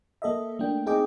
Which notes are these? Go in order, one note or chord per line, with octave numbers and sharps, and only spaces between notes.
A#3 A4 D#5 E5
A3 A#3 D4 G5
C4 D#4 G#4 D#5 G5 D6